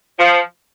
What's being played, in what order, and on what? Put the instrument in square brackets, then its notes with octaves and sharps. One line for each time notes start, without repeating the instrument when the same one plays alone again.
[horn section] F3